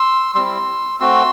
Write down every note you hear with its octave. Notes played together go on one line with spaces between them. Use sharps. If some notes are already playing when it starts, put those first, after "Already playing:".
Already playing: C6 E6
G3 C4 E4 C6 E6
A3 C4 F#4 C6 E6